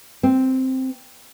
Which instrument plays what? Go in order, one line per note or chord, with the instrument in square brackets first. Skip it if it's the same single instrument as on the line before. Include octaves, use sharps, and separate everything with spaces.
[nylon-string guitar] C4